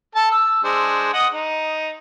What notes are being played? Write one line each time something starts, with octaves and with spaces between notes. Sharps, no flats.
A4 A5
E6
G#3 D4 C5
D#5 F#5 D#6
D#4